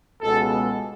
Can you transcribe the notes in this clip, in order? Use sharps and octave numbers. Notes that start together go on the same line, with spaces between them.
C#2 B2 G#3 B3 A4